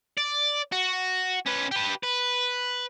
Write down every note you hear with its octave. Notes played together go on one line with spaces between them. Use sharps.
D5
F#4
C#4 B4
G4 B4
B4